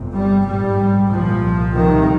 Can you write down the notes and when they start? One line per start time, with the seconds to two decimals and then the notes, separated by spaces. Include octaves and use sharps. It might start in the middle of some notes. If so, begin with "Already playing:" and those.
Already playing: G1 F2 C3
0.14 G3
0.46 A#1 G#2 G3
1.11 C2 A#2 F3
1.75 C2 C3 D#3